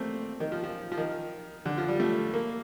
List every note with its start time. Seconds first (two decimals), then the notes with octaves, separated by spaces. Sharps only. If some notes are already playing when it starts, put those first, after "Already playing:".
Already playing: A3 A#3 C4
0.40 D#3
0.52 F3
0.64 F3
0.92 F3
0.98 D#3
1.66 D3
1.78 F3
1.88 G3
2.00 A3
2.34 A#3